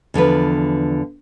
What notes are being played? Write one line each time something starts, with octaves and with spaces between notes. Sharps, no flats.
E2 D3 F3 B4